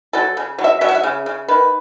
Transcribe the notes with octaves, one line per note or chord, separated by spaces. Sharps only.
F#3 A4
C#3
F#3
E5
F#3 E5
F#5
E5
C#3
C#3
D#3 B4